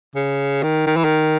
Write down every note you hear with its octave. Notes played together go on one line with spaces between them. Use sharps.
C#3
D#3
D#3
E3
D#3